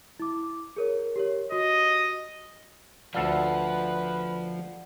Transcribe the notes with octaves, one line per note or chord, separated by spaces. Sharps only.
E4 D6
G#4 A#4 C#5
G4 A#4 C#5
F#4 D#5
D2 F3 A4 B4 D5 F5 F#5